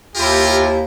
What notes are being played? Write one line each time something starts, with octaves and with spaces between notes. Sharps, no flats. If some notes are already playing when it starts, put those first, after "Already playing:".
D#2 E4 F4 G4 A#4